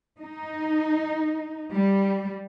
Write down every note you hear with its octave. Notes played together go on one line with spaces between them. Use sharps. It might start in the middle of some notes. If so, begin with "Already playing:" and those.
D#4
G3